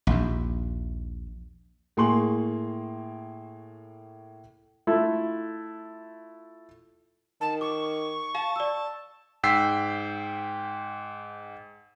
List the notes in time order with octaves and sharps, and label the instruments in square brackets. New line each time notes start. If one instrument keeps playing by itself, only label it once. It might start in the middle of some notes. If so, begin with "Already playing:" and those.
[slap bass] A#1 D#2
[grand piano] A2 A#3 G#4 C6 C#6 F#7
[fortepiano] A3 E4 F4 A4
[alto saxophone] D#3 [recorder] A5
[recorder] C#6 [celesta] D6
[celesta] F5 [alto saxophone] A5
[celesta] D5 E6
[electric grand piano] G#2 G5 E6 B6 C7